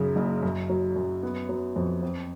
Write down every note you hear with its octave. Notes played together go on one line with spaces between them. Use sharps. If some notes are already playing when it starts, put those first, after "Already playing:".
Already playing: F#2 C#3
F#1
F#2
F#3
F#2
B3
F#3
F2
C4